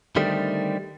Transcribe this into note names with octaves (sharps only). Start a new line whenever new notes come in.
D3 D#3 G3 A3 C4